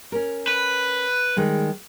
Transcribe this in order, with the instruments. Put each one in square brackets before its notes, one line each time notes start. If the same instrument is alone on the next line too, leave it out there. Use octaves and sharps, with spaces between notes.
[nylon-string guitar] C#4 A#4
[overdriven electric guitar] B4
[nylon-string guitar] D#3 G3 G#3